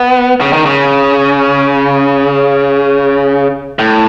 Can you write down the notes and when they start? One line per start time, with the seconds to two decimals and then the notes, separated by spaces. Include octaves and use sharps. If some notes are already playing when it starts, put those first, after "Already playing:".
Already playing: B3
0.41 C#3
0.53 D#3
0.66 C#3
3.79 A2